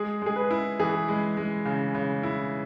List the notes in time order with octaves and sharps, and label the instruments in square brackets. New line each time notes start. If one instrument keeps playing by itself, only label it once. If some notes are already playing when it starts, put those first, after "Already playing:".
Already playing: [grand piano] G#3 [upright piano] G#4
[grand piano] G#3 [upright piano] G#4
[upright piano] B4
[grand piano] E4
[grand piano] E3 [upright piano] G#4
[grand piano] G#3
G#3
C#3
C#3
E4